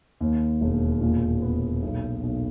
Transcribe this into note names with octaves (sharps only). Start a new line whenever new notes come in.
D#2
E1
A#2
B3
B1
B1